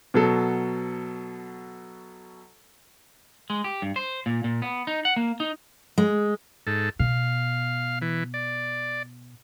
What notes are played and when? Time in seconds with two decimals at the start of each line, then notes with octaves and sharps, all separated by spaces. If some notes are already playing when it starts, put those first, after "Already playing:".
0.14 B2 F#3 A4
3.50 G#3
3.64 G4
3.82 G2
3.96 C5
4.26 A#2
4.44 A#2
4.62 B3
4.87 D#4
5.05 F#5
5.16 A#3
5.40 D#4
5.98 G#3
6.67 G#2 A4
6.99 B2 F5
8.01 E3
8.34 D5